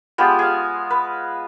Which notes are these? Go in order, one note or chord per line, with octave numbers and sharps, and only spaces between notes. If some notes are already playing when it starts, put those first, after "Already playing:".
G#3 B3 F4 G4
G#4 F5
B4